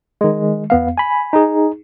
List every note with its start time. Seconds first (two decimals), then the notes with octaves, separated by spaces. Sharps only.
0.21 D#3 G#3
0.70 E2 B3 F5
0.98 G#5 B5
1.33 D#4 G#4